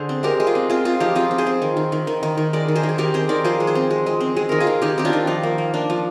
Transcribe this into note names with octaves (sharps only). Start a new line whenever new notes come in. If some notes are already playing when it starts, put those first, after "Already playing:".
Already playing: D3 G#4 C5
C4
G#3 G4 A#4
G#3
F4 G#4
C4
C4 F4 G#4
C4 F4 G#4
F3 D#4 G4
C4 F4 G#4
C4
G#4 C5
C4
D#3
D#3
D#3
D#3
D#3
D#3
G#3 A#4 D5
D#3
G#4 C5
D#3
G#4
D#3 G4 A#4
C4 G#4 C5
D#3 A#4 D5
F3 G#4 C5
G#3
G#4 C5
C4
G#3
G#3
C4
G#3 G#4
D#3 A#4
F4 G#4
D#3
D#3 D#4 G4
C4 G4
D4 F4
D#3
F3 D#4
A#3
A#3
A#3 D4
F3